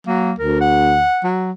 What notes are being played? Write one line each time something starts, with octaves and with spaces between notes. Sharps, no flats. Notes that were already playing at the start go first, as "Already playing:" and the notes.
F#3 A#3
D2 A#4
F#5
F#3